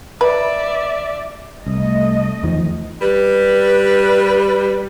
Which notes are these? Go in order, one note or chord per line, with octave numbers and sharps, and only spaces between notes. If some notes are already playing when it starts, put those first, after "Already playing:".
B4 D5 E5
C2 A3 D#5
E2 D#3 F3
G3 B4